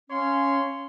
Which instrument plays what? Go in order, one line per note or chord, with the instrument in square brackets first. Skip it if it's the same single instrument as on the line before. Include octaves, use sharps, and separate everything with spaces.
[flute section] C#4 [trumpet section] C#5 F5 C6